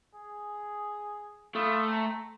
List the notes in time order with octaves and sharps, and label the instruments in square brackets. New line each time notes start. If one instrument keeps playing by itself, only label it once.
[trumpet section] G#4
[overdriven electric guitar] A3 [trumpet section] F4 B5 D#6
[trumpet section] C4 A5 A#5